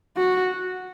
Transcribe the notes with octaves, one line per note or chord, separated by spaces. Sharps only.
F#4